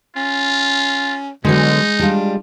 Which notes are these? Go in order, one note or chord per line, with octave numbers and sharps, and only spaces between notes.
C#4 F4
B2 D3 F#3 G#3 D#4
G3 D4 F4